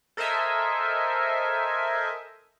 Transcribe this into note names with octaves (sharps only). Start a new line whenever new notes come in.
A4 A#4 C5 D#5 E5 G#5